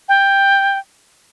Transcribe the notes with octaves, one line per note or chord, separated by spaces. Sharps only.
G5